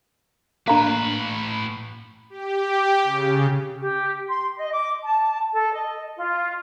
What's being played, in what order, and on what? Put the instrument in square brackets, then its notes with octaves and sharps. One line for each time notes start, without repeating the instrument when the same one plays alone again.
[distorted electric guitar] A2 B4 [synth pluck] A#3 D4 [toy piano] F5 A#5
[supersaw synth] G4
C#3
[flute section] G4
C6
D#5
D6
A5
A4
D#5
F4